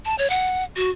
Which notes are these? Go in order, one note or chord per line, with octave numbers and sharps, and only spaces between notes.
A5
C#5
F#5
F#4